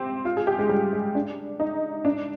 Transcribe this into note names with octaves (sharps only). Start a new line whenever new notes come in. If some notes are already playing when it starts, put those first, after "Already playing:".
Already playing: C4 G4
F4
G#4
G4
G#3
G3
G#3
D4
D#4
D4